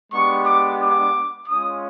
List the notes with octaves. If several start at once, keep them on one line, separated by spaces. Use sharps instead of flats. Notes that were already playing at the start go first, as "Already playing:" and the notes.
G#3 B3 D4 G4 C#6
D6
D6
G#3 C#4 F4 D#6